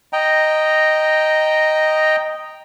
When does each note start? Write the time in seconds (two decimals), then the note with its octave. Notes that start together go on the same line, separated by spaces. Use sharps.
0.13 D#5 G5 A#5